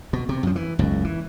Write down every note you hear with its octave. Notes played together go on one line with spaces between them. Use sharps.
B2
C3
F#2 F3
E3
F#1 C#2 F#2
E3